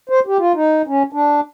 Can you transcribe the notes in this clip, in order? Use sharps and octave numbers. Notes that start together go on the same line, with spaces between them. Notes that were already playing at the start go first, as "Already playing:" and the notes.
C5
G4
F4
D#4
C#4
D4